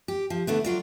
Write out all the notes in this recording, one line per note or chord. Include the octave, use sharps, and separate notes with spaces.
G4
F3
D3 A3 B3
F#3 F4 D5